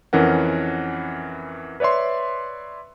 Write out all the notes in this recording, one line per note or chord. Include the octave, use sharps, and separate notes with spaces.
F2 E3 C#4 A#4 F#5
B4 C#5 D5 E5 C6